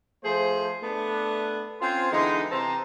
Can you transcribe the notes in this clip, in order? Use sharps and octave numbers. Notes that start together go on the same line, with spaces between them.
F3 A3 G#4 C5
A3 B3 D4
C4 C#4 F4 C5 G#5 C6
D3 E3 G#3 B3 D#4
C3 E3 C4 A5 A#5 C6